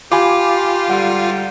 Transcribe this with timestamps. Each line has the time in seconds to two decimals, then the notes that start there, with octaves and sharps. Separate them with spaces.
0.12 F4 G4 G#5 B5 D6
0.90 G#2 D3 G3 F#5